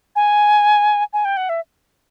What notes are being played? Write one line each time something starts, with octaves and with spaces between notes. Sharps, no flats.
G#5
G#5
G5
F#5
E5